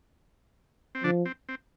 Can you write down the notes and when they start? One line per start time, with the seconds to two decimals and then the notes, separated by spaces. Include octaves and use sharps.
0.95 C4
1.03 D3 F3 D4
1.25 C4
1.49 C4